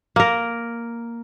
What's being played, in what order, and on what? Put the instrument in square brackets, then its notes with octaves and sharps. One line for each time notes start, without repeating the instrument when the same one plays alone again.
[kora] A#3 A#4